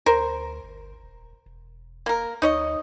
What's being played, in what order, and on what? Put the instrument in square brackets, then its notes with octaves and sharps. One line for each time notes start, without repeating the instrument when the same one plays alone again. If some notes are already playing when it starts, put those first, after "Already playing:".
[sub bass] D2 [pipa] A#4 C5
[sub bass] G1
D#1
E1
[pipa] A#3 A#4
[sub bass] D2 [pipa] D#4 C#5 D#5